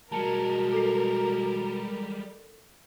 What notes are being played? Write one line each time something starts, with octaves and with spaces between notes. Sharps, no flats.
B2 G3 G#3 A#4 A5 C#7
A4 C7